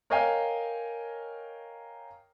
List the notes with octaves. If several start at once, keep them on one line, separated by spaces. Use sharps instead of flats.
A#4 C#5 D#5 F5 G5 G#5